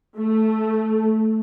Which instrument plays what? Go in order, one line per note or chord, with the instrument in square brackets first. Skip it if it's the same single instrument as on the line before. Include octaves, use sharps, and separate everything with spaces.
[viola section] A3